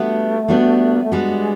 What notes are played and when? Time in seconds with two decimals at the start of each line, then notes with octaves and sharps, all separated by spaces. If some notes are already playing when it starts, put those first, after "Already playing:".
Already playing: G3 A3 B3 D4 F#4
0.48 G3 B3 D4 F#4
0.96 A#3
1.03 A3
1.12 G3 G#3 B3 D4 F#4